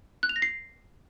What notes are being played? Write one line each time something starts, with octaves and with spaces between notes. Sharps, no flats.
F#6
F7
A#6
C7